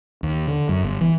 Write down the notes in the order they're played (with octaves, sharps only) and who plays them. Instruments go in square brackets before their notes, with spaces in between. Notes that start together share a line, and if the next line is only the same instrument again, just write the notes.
[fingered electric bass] D#2
D3
F#2
G1
E3